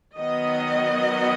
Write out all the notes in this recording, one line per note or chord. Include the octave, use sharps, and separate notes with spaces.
D#3 F#3 B3 D#5